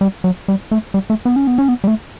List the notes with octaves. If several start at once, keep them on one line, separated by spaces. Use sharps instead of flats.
G3
F#3
G3
A3
G3
A3
B3
C#4
B3
C#4
B3
G3
A3